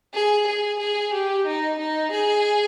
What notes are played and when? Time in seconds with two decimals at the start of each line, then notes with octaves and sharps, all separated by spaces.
0.14 G#4
0.47 G#4
0.79 G#4
1.13 G4
1.46 D#4
1.79 D#4
2.12 G#4